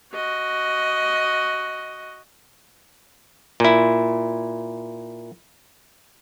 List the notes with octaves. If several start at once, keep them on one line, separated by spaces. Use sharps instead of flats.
F#4 D#5
A#2 E4